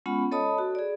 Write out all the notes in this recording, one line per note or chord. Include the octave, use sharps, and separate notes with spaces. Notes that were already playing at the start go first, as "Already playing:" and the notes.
G#3 B3 C#4 F4 F#5 B5
A4 C#5 D#5 A5 B5 D#6
F#4
G#4 D5